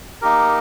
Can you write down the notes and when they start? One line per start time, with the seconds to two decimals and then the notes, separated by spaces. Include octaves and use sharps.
0.22 A#3 D#4 G4 A#4